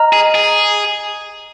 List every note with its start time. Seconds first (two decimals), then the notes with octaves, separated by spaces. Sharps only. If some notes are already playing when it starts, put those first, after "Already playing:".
Already playing: D#5 A#5 F6
0.13 G#4
0.35 G#4